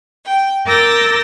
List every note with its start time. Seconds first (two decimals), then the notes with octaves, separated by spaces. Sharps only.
0.25 G5
0.65 A#4 D6 E6 G6 A6 A#6